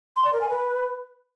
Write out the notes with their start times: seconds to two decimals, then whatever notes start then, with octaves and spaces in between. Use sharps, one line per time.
0.16 C6
0.25 D5
0.33 A#4
0.41 G#5
0.49 B4